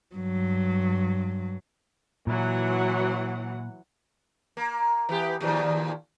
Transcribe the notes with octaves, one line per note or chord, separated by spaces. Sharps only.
G2 F#3
A#2 E3 F#3 F#5
A#3
E3 B3 G4
D#2 A#2 F3